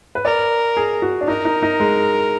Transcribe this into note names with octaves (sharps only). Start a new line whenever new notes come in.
B4
A#4 D5
G#4
F#4
D4
D#4 A#4
D#4
D#4
G#3